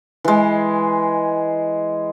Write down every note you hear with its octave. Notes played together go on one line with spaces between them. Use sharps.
E3 G#3